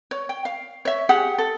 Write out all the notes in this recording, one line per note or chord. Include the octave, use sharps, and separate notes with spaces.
C#5
G5
F5
C#5 E5
G4 G#4 F#5
A4